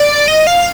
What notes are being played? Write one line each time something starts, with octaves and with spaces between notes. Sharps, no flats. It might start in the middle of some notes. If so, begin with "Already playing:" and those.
Already playing: D5
D#5
F5